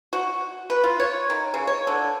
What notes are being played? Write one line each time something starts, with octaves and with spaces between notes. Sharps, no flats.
F#4
B4
F4
C#5
D#3
C#3
C#5
D3